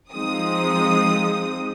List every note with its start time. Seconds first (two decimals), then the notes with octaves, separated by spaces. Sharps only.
0.12 F3 G#3 C4 D#4 D#6